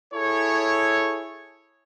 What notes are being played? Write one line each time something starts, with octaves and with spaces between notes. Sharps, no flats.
E4 G#4 A4 C#5